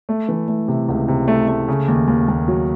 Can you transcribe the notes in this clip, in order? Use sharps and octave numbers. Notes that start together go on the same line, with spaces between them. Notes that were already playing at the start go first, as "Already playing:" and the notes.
A3
E3
A3
C3
C#2
C3
A3
A3
C#3
D#2
D#2
D#2
F#3